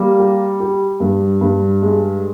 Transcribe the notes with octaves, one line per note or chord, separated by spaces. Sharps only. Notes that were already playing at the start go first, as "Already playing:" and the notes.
Already playing: G3 A#3
G4
G4
G2
G2
G#3